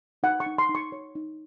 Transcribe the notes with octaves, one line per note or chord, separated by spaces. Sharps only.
D#4 F#5
C#6
D#4
C6
D#4
C#6
C#5
D#4